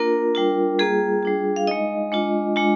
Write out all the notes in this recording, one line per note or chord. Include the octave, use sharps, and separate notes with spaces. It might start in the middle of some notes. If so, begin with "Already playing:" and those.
Already playing: A#3 D4 F4 A#4
G3 D4 F4
G3 A#3 F4 G#4
G3 D4 F4
F5
G#3 D#4 D#5
G#3 D4 F4
G#3 D4 F4